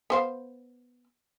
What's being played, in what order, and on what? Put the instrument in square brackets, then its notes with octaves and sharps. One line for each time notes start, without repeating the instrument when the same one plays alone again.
[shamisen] B3 C5 F5